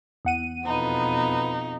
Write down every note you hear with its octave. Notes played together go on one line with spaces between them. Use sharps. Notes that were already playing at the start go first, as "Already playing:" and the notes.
E2 F#5 D#7
F2 B2 D#4 B4